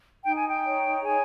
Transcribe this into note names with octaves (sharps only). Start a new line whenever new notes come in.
D#4 G5
G#5
G5
C#5
G#4 G#5